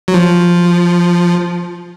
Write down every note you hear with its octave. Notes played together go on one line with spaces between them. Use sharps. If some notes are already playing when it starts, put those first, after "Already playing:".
F#3
F3